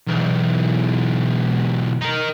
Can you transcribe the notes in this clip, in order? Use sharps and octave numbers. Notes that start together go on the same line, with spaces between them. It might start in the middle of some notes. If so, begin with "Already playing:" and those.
B1 E2
D#4 A#4